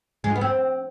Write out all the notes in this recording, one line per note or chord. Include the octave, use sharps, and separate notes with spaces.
G#3
F4
B3
C4